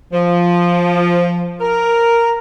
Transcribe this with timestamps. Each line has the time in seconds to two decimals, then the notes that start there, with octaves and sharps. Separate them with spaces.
0.12 F3
1.60 A#4